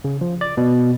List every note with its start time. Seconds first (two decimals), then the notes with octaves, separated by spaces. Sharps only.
0.04 C#3
0.21 F3
0.41 D5
0.57 B2